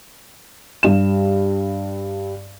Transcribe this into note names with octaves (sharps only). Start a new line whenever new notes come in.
G2 E7